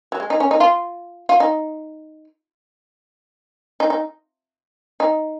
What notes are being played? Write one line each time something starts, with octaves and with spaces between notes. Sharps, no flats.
F#3
G#3
D#4
C#4
D#4
F4
F4
D#4
D#4
D#4
D#4